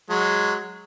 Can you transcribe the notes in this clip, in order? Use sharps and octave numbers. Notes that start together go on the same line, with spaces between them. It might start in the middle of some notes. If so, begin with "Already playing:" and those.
F#3 G#3